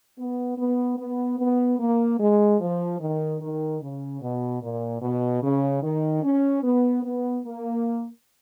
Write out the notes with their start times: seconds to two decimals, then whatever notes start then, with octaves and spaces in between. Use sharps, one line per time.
0.18 B3
0.58 B3
0.98 B3
1.39 B3
1.79 A#3
2.20 G#3
2.60 F3
3.00 D#3
3.41 D#3
3.81 C#3
4.21 B2
4.62 A#2
5.01 B2
5.42 C#3
5.82 D#3
6.23 C#4
6.63 B3
7.03 B3
7.44 A#3